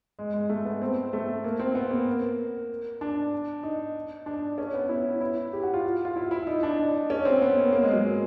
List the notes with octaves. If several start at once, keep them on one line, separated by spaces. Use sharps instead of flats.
G#3
G#3
A3
B3
C4
A3
A#3
C4
B3
A#3
D4
D#4
D4
C#4
B3
E4
E4
G4
F#4
F4
F4
E4
E4
D#4
D4
D#4
C#4
C4
B3
A#3
A#3
G#3
F#3